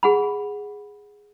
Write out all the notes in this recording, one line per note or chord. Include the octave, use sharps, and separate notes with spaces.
G#4 F#5 B5